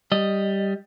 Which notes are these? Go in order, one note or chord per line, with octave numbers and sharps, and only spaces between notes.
G3 D#5